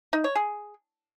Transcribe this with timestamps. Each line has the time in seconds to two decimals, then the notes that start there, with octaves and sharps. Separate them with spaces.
0.13 D#4
0.24 C#5
0.35 G#4